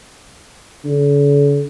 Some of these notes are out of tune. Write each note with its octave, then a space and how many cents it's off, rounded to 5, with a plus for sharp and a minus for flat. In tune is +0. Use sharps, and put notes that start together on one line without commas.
D3 -45